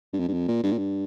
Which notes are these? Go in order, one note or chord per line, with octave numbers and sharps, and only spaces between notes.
G2
F2
G2
F2
A#2
G2
A#2
G2